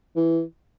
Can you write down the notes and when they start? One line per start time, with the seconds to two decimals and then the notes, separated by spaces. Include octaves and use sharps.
0.16 E3